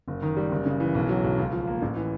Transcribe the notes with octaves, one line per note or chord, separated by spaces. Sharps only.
F#1
D#3
G3
F#1
C#3
E3
B1
F#3
B1
C#2
F3
A#3
A1
E3